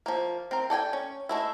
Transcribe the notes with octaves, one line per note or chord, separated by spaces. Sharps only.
F3 A#3
C4 A#4
A4 D5 G5 G#5
C#4
G#3 A3 E4